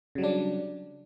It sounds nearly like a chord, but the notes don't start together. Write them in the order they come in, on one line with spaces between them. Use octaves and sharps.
C#3 F#3 G3 D4